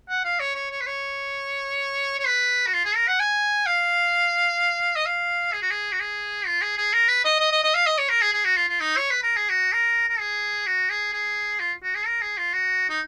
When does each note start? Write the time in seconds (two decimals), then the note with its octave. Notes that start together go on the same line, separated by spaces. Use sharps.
0.09 F#5
0.25 F5
0.40 C#5
0.55 C#5
0.71 C#5
0.81 B4
0.87 C#5
2.19 C#5
2.26 B4
2.67 F#4
2.74 F4
2.85 G#4
2.96 A#4
3.08 F#5
3.20 G#5
3.66 F5
4.96 D#5
5.06 F5
5.53 G#4
5.62 F#4
5.70 G#4
5.92 F#4
6.00 G#4
6.46 F4
6.62 G#4
6.78 G#4
6.93 A#4
7.08 B4
7.25 D#5
7.40 D#5
7.51 D#5
7.64 D#5
7.75 F5
7.87 D#5
7.98 C#5
8.09 A#4
8.22 G#4
8.33 G#4
8.45 F#4
8.57 F4
8.69 F4
8.80 D#4
8.97 C#5
9.11 B4
9.23 A#4
9.37 G#4
9.50 F#4
9.73 A#4
10.08 A#4
10.19 G#4
10.66 F#4
10.90 G#4
11.13 G#4
11.60 F4
11.83 F#4
11.95 G#4
12.06 A#4
12.22 G#4
12.38 F4
12.53 F#4
12.89 D#4